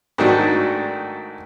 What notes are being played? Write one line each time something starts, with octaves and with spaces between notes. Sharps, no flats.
G#2 D#3 F#3 A3 D4 F#4